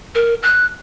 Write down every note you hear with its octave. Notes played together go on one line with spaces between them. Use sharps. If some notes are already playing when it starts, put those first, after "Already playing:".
A#4
F#6